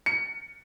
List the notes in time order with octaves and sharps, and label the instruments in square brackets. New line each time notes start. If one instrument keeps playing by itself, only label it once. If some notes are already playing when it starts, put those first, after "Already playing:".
[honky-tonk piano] C#7